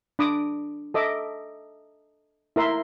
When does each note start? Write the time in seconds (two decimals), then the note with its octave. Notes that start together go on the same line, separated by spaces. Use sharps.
0.19 D4 B5 D6 D#6
0.94 A4 D#5 E5 D6
2.56 E4 A#4 E5 C6